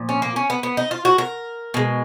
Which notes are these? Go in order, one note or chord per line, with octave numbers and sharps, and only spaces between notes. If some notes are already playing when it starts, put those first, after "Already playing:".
Already playing: A#2 F3
C#4
A#3
C#4
B3
B3
D#4
F4
F#4
A#4
B2 G#3